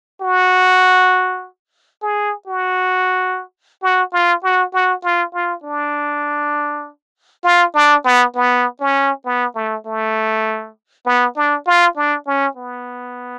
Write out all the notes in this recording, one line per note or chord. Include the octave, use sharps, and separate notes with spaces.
F#4
G#4
F#4
F#4
F4
F#4
F#4
F4
F4
D4
F4
D4
B3
B3
C#4
B3
A3
A3
B3
D4
F4
D4
C#4
B3